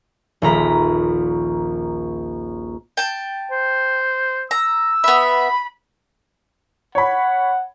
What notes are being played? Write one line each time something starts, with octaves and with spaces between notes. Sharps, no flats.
D#1 A#1 A#5 B5
G5 A5
C5
A#5 E6
B3 E5 B5
C#5 F#5 B5